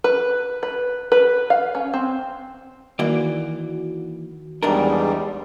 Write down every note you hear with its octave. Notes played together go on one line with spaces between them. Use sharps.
B4
B4
B4
F5
C#4
C4
D#3 E3 A#3 F#4 D5
E2 G#2 G3 D4 D#4 A#4 A5